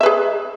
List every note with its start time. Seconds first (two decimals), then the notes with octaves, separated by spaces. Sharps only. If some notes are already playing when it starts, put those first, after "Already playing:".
0.01 E5
0.03 B4
0.06 G#4